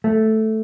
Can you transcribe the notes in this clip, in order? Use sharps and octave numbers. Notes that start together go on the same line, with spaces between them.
A3